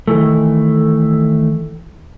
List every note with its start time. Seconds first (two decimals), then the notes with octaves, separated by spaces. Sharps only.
0.08 D#3 E3 A3